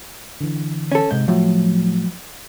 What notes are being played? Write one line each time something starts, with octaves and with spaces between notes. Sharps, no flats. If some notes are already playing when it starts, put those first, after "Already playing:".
D3 E3
C#4 A4
G#2 C3 G6
A2 F3 F#3 F#4